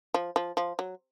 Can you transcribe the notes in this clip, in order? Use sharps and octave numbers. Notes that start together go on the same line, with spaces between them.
F3
F3
F3
F#3